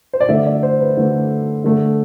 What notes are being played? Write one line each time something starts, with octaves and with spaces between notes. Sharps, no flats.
C5
D5
D3 A3 E5
D5
C5
B4
D3 A3
D3 A3